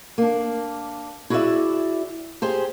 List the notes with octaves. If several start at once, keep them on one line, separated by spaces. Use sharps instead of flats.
A#3 D4
E4 F#4 G#4 C#5 D5 E5
G4 G#4 C5